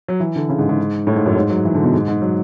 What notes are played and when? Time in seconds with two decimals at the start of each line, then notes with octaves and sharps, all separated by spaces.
0.08 F#3
0.20 E3
0.36 D3
0.49 C#3
0.59 G#2
0.69 G#2
1.07 A2
1.16 G#2
1.26 F#2
1.36 G#2
1.50 F#3
1.65 E3
1.75 D3
1.84 B2
1.94 G#2
2.08 G#2
2.22 F#3